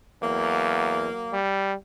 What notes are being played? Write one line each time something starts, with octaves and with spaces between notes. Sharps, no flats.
E2 F#3 A#3
G3